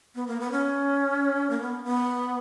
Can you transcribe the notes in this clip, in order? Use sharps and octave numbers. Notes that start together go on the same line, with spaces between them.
B3
A#3
B3
C#4
A#3
B3
B3